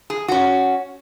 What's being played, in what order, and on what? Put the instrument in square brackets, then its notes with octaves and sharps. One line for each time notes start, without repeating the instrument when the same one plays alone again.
[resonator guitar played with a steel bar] G#4
C#4 F#4